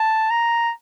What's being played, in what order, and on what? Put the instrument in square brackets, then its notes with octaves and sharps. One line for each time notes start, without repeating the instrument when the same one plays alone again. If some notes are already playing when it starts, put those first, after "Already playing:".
Already playing: [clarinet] A5
A#5